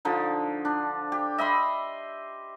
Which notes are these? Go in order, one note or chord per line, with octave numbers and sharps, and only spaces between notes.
D3 F3 D#4
D4
G4
D#5 E5 B5 C6